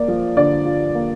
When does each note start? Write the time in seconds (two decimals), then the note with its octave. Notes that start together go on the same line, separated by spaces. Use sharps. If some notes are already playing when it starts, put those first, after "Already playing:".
Already playing: A#3 D5
0.08 F3
0.37 D3 D5
0.65 F4
0.95 A#3